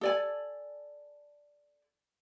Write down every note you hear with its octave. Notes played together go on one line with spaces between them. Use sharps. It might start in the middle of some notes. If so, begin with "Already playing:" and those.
A4 D5 G#5